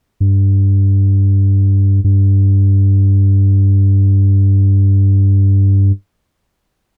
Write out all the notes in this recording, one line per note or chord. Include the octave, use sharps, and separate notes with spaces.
G2
G2